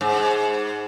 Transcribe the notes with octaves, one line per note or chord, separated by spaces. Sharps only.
G#2